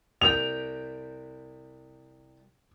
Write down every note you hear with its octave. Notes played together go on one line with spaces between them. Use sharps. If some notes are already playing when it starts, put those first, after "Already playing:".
C2 G5 F7